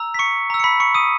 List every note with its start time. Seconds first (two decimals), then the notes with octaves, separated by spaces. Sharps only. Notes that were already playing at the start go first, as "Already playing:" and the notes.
Already playing: A#5 E6
0.14 B6
0.19 C#6 C#7
0.50 A#5 E6
0.60 C#7
0.64 B5 B6
0.80 C#6 C#7
0.95 D#6 D#7